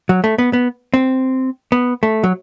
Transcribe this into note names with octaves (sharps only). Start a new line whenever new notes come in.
F#3
A3
B3
B3
C4
B3
A3
F#3